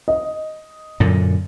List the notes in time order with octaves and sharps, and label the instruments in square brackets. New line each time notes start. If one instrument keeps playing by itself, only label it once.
[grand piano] D#5
[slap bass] F#2 A#2 D3